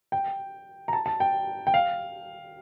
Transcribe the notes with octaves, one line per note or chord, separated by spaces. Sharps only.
G5
A#5
A5
A5
G5
G5
F5